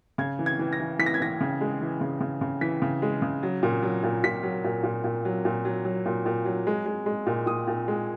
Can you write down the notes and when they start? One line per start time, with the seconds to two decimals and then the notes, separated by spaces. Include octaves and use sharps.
0.18 C#3 G#6
0.39 E3
0.46 G#6
0.59 E3
0.73 A#6
0.79 E3
0.99 E3 B6
1.06 A#6
1.14 G#6
1.20 E3 A#6
1.41 C#3
1.61 G#3
1.81 E3
2.01 C#3
2.21 C#3
2.41 C#3
2.61 E3 B6
2.82 C#3
3.02 G#3
3.22 C#3
3.43 F#3
3.63 A#2
3.82 F#3
4.03 A#2
4.24 A#2 B6
4.43 F#3
4.64 A#2
4.83 A#2
5.04 A#2
5.25 F#3
5.45 A#2
5.65 F#3
5.85 F#3
6.06 A#2
6.26 A#2
6.45 F#3
6.67 G#3
6.86 G#3
7.06 G#3
7.27 A#2
7.46 A#2 D#6
7.67 A#2
7.88 G#3